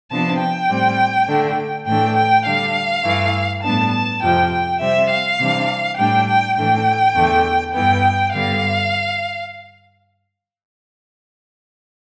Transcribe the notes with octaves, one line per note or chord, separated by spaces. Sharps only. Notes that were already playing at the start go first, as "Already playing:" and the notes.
C3 F3 B3 D4 A5
G5
A2 G3 C4
D3 A3 D4
A2 E3 A3 D4 G5
G5
D3 G3 D4 F5
G2 E3 A3
A2 G3 B3 D4 A5
A5
F2 C3 F3 G5
G5
C3 G3 C4 E5
F5
C3 E3 G3 D4
A2 G3 D4 G5
G5
A2 E3 A3 D4 G5
E2 D3 A3
G2 E3 B3 G5
G2 D3 G3 B3 F5